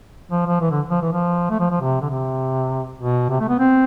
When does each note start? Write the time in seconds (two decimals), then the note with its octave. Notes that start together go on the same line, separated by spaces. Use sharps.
0.31 F3
0.46 F3
0.61 E3
0.71 D3
0.91 F3
1.02 E3
1.12 F3
1.50 A3
1.60 F3
1.70 F3
1.81 C3
2.01 D3
2.10 C3
2.99 B2
3.30 C3
3.40 A3
3.49 B3
3.59 C4